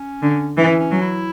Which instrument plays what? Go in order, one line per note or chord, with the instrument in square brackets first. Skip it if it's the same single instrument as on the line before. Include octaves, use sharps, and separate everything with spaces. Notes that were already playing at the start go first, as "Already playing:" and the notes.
Already playing: [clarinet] C#4
[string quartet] D3
[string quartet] E3 [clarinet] C#4
[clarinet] C#4
[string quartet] F#3
[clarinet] E4